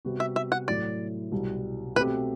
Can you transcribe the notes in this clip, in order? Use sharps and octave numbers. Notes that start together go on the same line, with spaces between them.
C3 G3 B3 F#4
E5
E5
F#5
A2 F#3 A3 E4 D5
C2 B2 G3
B2 A3 C4 G4 B4